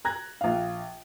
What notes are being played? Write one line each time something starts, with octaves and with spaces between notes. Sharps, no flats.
A#5 F#6 G#6 A#6
A#1 F5